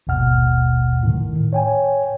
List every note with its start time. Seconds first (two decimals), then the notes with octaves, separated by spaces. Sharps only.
0.07 G#1 D#2 B2 F#5 F6
1.03 A2 D#3
1.53 C#5 G5 G#5